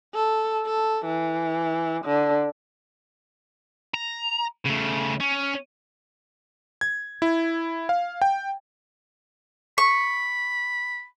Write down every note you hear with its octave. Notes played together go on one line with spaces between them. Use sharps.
A4
A4
E3
D3
A#5
C#3 A3
C#4
G#6
E4
F5
G5
B5 C#6